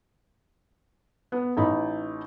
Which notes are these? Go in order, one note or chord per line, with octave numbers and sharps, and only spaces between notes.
B3
A1 D#4 B5